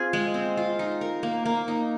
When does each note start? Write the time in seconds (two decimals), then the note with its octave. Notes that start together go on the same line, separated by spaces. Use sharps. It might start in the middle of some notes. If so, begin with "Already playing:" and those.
Already playing: C4 F4 G#4
0.13 G#3
0.34 C4
0.57 F4
0.79 D#4
1.01 A#4
1.23 A#3
1.46 A#3
1.68 D#4